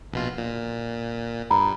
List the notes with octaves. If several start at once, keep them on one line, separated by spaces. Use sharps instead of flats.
A#1 B2 F4
A#2
G2 A#5 B5